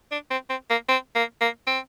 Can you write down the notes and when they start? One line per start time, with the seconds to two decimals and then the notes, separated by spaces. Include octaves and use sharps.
0.12 D4
0.31 C4
0.50 C4
0.70 A#3
0.89 C4
1.15 A#3
1.41 A#3
1.67 C4